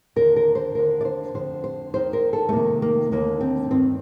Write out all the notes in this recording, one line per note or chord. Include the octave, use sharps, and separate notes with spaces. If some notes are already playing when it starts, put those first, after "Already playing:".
D#2 D3 A#4
A#4
C5
D#2 D3 A#4
D5
C5
F2 D3 C5
C5
D#2 D#3 C5
A#4
A4
A3
F2 C3 D#3 A#3
A#3
D#2 D3 A#3
C4
G2 D#3 C4